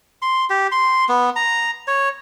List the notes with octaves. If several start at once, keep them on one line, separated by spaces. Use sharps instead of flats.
C6
G4
C6
B3
A#5
C#5